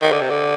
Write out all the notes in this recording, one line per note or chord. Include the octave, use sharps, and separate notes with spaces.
D#3
D3
C3
D3